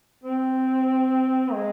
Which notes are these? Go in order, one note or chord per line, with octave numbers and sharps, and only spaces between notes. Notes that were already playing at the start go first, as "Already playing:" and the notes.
C4
G#3